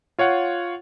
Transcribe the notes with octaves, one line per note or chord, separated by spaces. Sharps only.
F4 C#5 F5 F#5